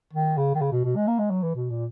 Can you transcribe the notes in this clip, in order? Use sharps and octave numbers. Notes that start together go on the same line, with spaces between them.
D#3
C#3
D#3
C#3
B2
B2
G#3
A#3
G#3
F#3
E3
B2
A#2